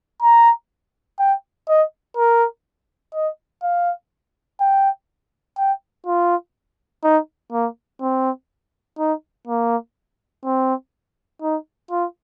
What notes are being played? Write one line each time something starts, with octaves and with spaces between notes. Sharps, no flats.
A#5
G5
D#5
A#4
D#5
F5
G5
G5
F4
D#4
A#3
C4
D#4
A#3
C4
D#4
F4